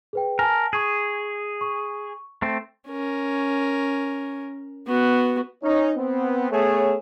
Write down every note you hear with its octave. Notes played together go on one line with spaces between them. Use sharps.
G#4 B4 G5
A#4 G#5 A5
G#4 C#6 G#6
C#6
A3 C4
C#4 A#4
B3 F#4
C#4 D#4
B3 C4
A3 B3 G#4 C#5